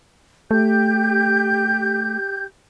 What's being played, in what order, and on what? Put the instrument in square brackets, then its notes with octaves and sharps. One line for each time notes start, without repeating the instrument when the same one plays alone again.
[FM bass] A3 [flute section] G4 G6